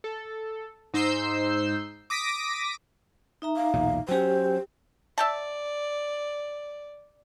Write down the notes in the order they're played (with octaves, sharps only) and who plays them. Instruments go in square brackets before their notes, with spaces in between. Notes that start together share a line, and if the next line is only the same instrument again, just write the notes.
[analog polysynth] A4
G#2 D#4 C5 E6 G6 C7
D6 D#6 A#6 B6 D7
[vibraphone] D#4 E5 A#5
[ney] F5
[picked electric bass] B1 E2 A#2
[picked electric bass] F#3 C#4 [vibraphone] G4 G5 [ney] C5
[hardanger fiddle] D5 [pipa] E5 G5 A5